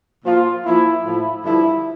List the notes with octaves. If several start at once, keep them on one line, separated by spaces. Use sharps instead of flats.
A#2 F3 F4
A#2 F3 E4
A2 F3 E4
G2 D3 F3 E4